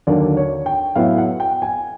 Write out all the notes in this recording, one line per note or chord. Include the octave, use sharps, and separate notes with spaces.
D#2 D3 F#3 A#3 D5
C#5
G5
A2 F#3 B3 E4 F5
F#5
G5
G#5